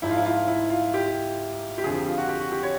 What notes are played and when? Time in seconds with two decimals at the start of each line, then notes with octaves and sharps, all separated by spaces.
0.02 G#2 F3 E4
0.11 F4
0.17 E4
0.25 F4
0.47 E4
0.70 F4
0.94 G4
1.78 G4
1.84 F2 D3 F3 G#4
1.95 G4
2.06 F4
2.18 F#4
2.28 G4
2.40 F#4
2.52 G4
2.63 C#5